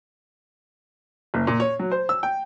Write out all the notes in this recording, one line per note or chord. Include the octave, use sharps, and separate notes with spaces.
F#1
A#2
C#5
F#3
C5
E6
G5